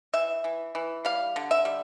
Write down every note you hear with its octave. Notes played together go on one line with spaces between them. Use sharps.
E3 E5
E3
E3
G3 F5
D3
E5
G3